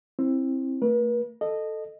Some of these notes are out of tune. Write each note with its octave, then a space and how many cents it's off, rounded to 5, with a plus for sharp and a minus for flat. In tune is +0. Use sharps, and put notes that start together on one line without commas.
C4 +20 E4 +0
A3 +35 B4 -45
A4 +0 D#5 -15